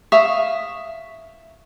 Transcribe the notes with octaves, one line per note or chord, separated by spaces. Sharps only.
E5 F5 C#6 D#6